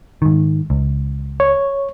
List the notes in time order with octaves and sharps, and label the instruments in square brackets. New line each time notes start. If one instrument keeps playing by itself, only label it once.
[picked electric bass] G#2 D#3
C#2
[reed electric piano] C#5